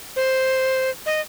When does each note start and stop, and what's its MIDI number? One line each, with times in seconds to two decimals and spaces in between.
0.16 0.90 72
1.06 1.21 75